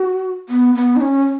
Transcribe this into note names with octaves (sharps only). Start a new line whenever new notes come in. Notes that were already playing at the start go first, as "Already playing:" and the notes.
Already playing: F#4
B3
B3
D#4
C#4